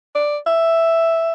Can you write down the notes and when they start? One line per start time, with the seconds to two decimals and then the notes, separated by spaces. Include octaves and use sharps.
0.15 D5
0.46 E5